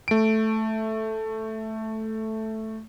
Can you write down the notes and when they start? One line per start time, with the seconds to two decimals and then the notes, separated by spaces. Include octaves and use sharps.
0.08 A3 D7